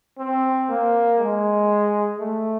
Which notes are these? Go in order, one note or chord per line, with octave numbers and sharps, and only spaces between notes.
C4
A#3
G#3
A3